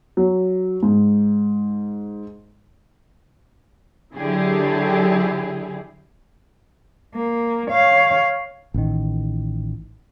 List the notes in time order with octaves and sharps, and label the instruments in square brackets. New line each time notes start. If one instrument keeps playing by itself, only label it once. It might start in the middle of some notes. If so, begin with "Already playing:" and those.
[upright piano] F#3
G#2
[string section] D3 F#3 E4 G4 G#4
[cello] A#3
C#5 F5
[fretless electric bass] A1 D#3